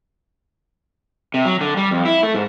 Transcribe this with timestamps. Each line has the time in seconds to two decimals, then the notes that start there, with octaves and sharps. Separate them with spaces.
1.34 C3
1.45 F#3
1.61 D3
1.77 G3
1.91 F2
2.05 E4
2.23 A3
2.35 G#2